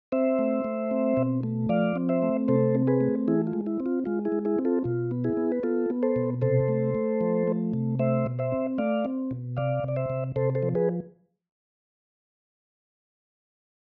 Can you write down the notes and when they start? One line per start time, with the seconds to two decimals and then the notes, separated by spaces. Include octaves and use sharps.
0.12 C4 C5 E5
0.39 A3
0.64 A3
0.91 C4
1.17 B2
1.43 A3
1.69 F3 D5 F5
1.96 C4
2.09 C5 E5
2.22 A3
2.48 C3 A4 C5
2.75 C4
2.87 G#4 B4
3.01 A3
3.28 E3 E4 G#4
3.47 F4
3.53 G#3
3.66 E4
3.80 C4
3.86 F4
4.05 G#3 F4
4.25 E4 G#4
4.32 G#3
4.45 E4 G#4
4.59 C4
4.65 F4 A4
4.84 B2 F4
5.11 B3
5.24 E4 G#4
5.37 B3
5.52 B4
5.63 B3 F4 A4
5.90 B3
6.03 A4 C5
6.16 B2
6.42 C3 A4 C5
6.68 A3
6.95 A3
7.21 F3
7.47 A3
7.73 C3
7.99 A3 C5 E5
8.26 B2
8.39 C5 E5
8.52 C4
8.78 A3 D5 F5
9.05 C4
9.31 B2
9.57 C3 D5 F5
9.84 C3 D5
9.96 C5 E5
10.10 C3
10.36 C3 A4 C5
10.55 A4 C5
10.63 F3
10.75 G#4 B4